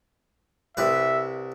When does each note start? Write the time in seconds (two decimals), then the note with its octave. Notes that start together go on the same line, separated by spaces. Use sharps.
0.77 C2 B4 E5